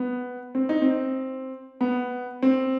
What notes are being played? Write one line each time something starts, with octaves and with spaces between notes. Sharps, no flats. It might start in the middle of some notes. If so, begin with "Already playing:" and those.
Already playing: B3
C4
D#4
C4
B3
C4